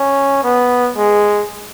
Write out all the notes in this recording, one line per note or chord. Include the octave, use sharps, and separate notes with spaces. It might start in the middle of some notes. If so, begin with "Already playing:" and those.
Already playing: C#4
B3
G#3